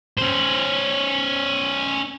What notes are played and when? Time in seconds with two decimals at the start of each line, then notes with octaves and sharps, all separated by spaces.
0.18 C#4 C5